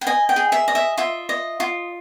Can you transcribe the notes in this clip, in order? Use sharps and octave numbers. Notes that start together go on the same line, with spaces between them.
G5
D#5 G#5
G5
G#4
E5
D#5
E5
F4 E5
D#5
F4